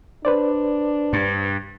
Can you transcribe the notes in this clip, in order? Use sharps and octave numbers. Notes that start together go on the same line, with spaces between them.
D4 B4 C5 D5
G2